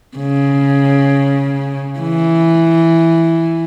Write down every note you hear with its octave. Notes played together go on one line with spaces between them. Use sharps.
C#3
E3